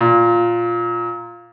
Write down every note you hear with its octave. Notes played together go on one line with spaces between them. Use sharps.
A#2